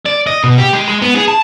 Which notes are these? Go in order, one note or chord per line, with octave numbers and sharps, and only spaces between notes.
D5
D#5
B2
G4
G#3
G#3
B3
G#4
A5